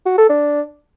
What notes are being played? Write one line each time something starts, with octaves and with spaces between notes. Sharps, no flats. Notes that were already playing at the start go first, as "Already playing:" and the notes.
F#4
A4
D4